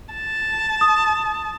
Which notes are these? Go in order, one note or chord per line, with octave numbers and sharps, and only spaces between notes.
A5
D#6